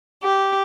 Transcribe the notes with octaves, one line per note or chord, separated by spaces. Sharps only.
G4